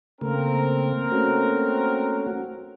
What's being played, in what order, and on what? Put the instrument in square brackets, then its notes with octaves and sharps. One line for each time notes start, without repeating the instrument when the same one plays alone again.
[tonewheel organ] C#3 A3 [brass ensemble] A#3 C4 A#4
[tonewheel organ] A3 C#4 F#4